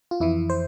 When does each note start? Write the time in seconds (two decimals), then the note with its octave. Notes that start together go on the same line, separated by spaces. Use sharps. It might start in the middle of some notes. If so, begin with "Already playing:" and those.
0.11 F4
0.20 F2 E3 E4
0.50 C5